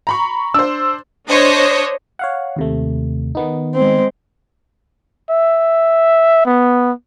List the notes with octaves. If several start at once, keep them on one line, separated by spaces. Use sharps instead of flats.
A#5 B5 C#6
D4 C5 E6
D4 C5 C#5 D#5
C#5 F5 F#5
D#2 C3 A3
D#3 B3 D#4
G#3 C4
E5
B3